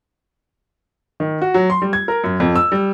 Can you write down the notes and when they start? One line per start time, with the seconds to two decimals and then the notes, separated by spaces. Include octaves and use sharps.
1.20 D#3
1.42 F#4
1.54 F#3
1.70 C6
1.82 G3
1.93 G#6
2.08 A#4
2.24 F#2
2.40 F2
2.56 E6
2.72 G3